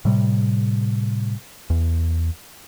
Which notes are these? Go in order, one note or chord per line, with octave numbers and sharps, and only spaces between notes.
A2 C3 G3
E2